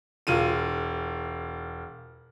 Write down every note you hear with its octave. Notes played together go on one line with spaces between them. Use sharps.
E1 F4 D#7